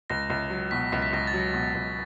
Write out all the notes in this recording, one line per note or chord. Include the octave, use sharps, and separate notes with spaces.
C#2 A#6
C#2
F#3
B2 B6
C#2
B6
C#2 A#6
A6
F#3
A#6
B2
C#2